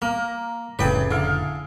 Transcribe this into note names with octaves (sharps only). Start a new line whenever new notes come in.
A#3 A#4 D6
F1 A2 C#3 G#4 B4 D5 G5
D3 E4 F5 D6